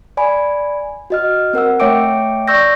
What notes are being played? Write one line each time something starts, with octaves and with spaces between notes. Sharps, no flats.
D5 G#5 B5
F#4 D#5 F6
C4 A#4 F#5 E6
A3 C#5 E5 G5 D6 D7
D5 C#6 E6 G6 A#6